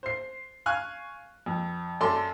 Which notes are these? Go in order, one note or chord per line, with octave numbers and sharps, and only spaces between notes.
C5 C7
F5 G#5 C#6 F6 F#6
F2
F#2 A4 D5 C6